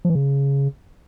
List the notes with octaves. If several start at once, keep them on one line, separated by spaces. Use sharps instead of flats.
F3
E3
C#3